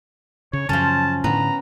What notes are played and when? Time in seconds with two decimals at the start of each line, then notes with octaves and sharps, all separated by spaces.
0.53 C#3 C#5
0.69 F#2 C#3 F3 C#4 A5
1.24 A2 D3 B3 A#5